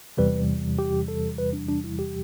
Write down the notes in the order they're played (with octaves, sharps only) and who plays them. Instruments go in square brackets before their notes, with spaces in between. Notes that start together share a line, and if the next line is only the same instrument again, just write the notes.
[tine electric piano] E2 C3 E3 G3 B4
G4
A4
B4
D4
D4
E4
G4